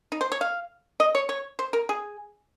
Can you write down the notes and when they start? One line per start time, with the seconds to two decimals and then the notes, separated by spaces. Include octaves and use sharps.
0.12 D#4
0.21 C5
0.32 C#5
0.41 F5
1.00 D#5
1.15 C#5
1.29 C#5
1.59 C5
1.73 A#4
1.89 G#4